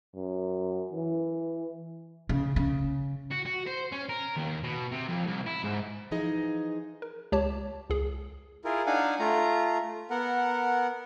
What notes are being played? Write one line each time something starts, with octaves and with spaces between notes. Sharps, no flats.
F#2
E3
C#3
C#3
F#4
F#4
C5
C#4
A#4
D#2
B2
C3
F2
C2
E4
G#2
E3 F3 D#4 G#4 D#5
A#4
C#2 G4 C#5 A5
C#2 G#4
E4 F4 G#4 A#4
D4 D#4 F5 F#5 G#5
A3 F4 A#5
B3 A#4 F#5